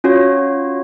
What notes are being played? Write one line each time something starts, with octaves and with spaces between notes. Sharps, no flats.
C#4 F4 F#4 C#5